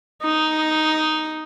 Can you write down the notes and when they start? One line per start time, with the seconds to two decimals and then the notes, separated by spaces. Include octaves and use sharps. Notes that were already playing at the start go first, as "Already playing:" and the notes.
0.24 D#4